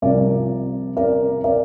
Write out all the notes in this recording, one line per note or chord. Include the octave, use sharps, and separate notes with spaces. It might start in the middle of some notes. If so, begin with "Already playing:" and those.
C2 C3 F3 A#4 D5
A#4 D5
A#4 D5